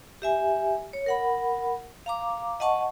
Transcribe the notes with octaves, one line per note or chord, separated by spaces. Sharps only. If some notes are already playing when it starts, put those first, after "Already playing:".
G4 E5 G#5
C#5
A#4 F#5 B5
F5 A#5 D6
D#5 F#5 A5 C#6